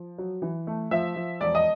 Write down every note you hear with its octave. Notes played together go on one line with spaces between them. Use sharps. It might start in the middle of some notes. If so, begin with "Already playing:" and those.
Already playing: F3
F#3
E3
A3
F3 E5
F3
E1 D5
D#5